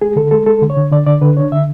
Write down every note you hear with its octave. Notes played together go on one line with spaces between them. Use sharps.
G#3 G#4
D3 A4
G#3 A4
G#3 A4
D3
C#5
D3
D3 D5
D3 D5
D3 B4
D4 C#5
D3 E5